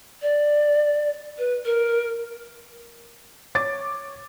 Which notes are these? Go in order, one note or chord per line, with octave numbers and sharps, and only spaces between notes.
D5
B4
A#4
C#5 D6 A6